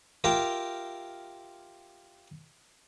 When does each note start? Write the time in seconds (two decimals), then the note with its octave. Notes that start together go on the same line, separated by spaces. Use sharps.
0.24 F4 G4 A#4 E5 G5